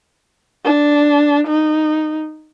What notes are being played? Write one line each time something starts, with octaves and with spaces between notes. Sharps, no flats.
D4
D#4